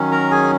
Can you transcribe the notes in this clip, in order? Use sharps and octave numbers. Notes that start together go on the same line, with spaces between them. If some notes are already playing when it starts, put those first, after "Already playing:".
Already playing: D#3 F#3 C#4
A#4 A#5
G#4 G#5